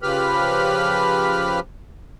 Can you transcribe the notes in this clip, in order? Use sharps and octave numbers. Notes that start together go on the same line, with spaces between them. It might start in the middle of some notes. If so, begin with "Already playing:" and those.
C#3 F3 G4 B4 B5 F6